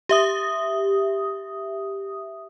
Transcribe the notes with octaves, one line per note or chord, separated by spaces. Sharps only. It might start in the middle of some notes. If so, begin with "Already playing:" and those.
G4 E5 D#6